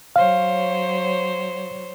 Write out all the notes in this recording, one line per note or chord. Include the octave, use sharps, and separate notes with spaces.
F#3 C5 C#5 F5